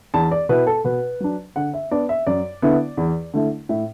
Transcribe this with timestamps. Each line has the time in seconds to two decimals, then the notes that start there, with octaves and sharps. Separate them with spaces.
0.14 E2 A5
0.31 D5
0.49 B2 B3 E4 B4
0.67 A4
0.85 B2 B4
1.20 F#3 D4
1.56 D3 F#5
1.74 E5
1.91 B3 D4 D5
2.09 E5
2.27 F#2 D5
2.62 D3 B3 E4
2.97 E2
3.34 D3 A3 E4
3.69 A2 E5